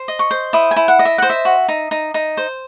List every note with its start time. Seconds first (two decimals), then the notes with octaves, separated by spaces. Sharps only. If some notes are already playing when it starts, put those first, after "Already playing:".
Already playing: C5
0.08 D#5
0.19 C#6
0.31 C5
0.53 E4 D#6
0.71 G#5
0.76 E4
0.88 F#5
0.99 D#5
1.05 E5
1.18 C5 F#5
1.30 E5
1.45 F#4
1.68 D#4
1.91 D#4
2.14 D#4
2.37 C5